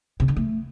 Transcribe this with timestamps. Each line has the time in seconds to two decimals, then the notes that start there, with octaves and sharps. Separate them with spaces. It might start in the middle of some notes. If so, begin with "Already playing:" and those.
0.20 C3
0.28 D3
0.36 A3